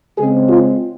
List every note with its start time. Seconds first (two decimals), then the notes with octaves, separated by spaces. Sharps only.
0.18 C#3 G#3 C4 G#4
0.49 F4